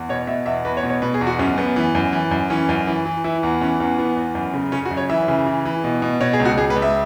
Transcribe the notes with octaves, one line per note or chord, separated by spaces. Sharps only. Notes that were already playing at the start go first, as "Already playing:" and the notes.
Already playing: E2
B2 C#5
B2 E5
E2 E5
E2 B4
C#5
B2
C#5
B2 B4
G#4
E2
F#4
F#2 C#4
F#2 B3
E3
F#2
E3
F#2
E3 C#4
F#2
E3
E3
E3 E4
E2
E3 C#4
E2 C#4
E3 B3
E2
F#2
C#3
C#3 C#4
F#4
F#2
C#5
E3 E5
C#3
E3
E3
B2
B2
B2 C#5
G#4
C#2
F#4
C#2 G#4
B4
C#2
E5